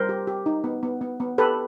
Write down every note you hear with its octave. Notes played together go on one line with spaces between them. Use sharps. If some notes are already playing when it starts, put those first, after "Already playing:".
Already playing: G3 A#4 C5
G4
G4
D#4
B3
B3
B3
B3
G4 A4 B4